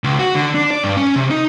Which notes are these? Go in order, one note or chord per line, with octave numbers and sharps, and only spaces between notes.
C#2
F#4
D3
D4
D5
G2
C#4
C3
D#4